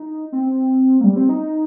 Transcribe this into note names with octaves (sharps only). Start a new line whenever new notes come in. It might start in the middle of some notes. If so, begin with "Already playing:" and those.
Already playing: D#4
C4
A#3
G3
C4
D#4